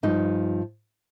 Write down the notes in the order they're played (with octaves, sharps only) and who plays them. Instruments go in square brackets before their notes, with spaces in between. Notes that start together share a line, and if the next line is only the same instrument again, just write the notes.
[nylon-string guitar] G2 F3 D#4